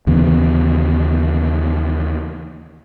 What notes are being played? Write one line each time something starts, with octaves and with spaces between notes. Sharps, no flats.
D#2 C#3 E3 B3